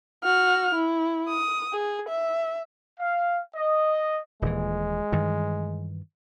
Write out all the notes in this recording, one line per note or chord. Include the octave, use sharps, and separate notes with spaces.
F#4 F6
E4
D#6
G#4
E5
F5
D#5
D#1 A#2 E3 G#3
G2 D#3 E3